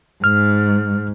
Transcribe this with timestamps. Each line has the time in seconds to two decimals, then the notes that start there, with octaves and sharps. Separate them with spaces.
0.24 G#2 F6